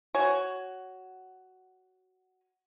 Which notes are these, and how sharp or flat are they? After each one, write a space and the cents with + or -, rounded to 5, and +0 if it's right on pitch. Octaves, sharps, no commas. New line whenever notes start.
F#4 +10 C#5 +0 G#5 +0